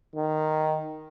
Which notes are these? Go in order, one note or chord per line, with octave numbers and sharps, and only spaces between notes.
D#3